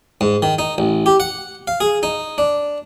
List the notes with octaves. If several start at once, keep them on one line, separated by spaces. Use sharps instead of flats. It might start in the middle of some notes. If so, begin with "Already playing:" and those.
G#2
D#3
D#4
A1
G4
F#5
F5
G#4
D#4
D4